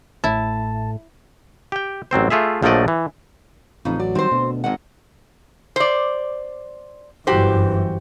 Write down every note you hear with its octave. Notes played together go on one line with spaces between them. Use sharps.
A1 A2 E4 A5
G4 G5
A1 F#3 C4 C5
A3 F4 G#4 E5
A#1 F3 F#3 A3 D5 D#5
E3
A1 F2 C#3 D#4
F#3 D5
D#3 G3 C4 C5
D2 B2
G#1 A#2 D#5 F#5
C5 D5
G1 F#2 E3 F#4 G4 C5